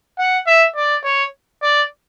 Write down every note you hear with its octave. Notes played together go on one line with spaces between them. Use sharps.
F#5
E5
D5
C#5
D5